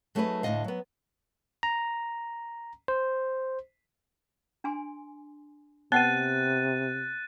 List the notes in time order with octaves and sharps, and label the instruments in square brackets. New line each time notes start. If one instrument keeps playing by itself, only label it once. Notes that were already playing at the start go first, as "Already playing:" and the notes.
[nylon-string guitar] F#3 A3 D#4 G#4 A4 B4
D2 A2 D3 F3 D#5 F5
F#3 B3
[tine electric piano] A#5
C5
[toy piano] D4 G#5 C6
[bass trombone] C3 [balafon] B3 [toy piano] B4 F#5 G5 [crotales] F#6 A6 D#7